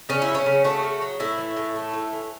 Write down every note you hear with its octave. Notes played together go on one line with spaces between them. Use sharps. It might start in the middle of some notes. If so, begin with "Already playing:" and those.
C#3 C#4
E4
F#3
C#4
C#3
A3 F#4
C#3
F#3
A2 E4
E3
A2
A3
A2
E3